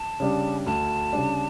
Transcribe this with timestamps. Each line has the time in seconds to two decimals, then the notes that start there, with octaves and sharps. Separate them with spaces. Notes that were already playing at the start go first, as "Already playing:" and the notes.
Already playing: A5
0.20 C#3 G3 D4
0.66 D2 A5
1.13 C#3 G3 D4